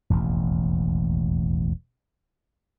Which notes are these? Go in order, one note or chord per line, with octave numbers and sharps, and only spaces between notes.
E1 A1 D#2